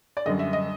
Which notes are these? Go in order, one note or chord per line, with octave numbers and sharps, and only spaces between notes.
D5
F#2 D3 G3 D#5
E5
D#5